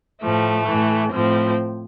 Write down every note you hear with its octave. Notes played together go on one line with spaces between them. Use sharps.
A2 F3 A3
A2 E3
A2 F3 C4